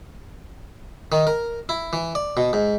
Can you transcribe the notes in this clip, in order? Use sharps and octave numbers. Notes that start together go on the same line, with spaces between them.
D#3
A#4
E4
E3
D5
B2
G#2